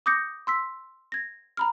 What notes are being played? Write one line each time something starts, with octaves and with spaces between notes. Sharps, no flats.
D6 D#6 G6 A#6 C#7
C6 E6 B6
G#6 A#6
A#5 B5 F6